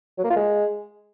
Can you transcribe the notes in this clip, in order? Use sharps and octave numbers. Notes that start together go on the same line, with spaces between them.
F#3
A#3
F4
G#3